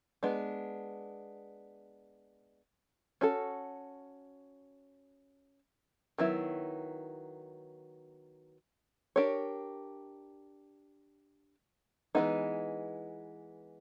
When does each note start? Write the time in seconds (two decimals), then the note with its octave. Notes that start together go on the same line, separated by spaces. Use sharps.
0.23 G#3 B3 D4
3.21 C#4 F#4 A4
6.18 D#3 F#3 B3 E4
9.16 D4 G4 A#4 C#5
12.15 E3 G#3 B3 D#4